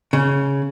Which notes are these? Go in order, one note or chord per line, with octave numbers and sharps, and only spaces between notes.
C#3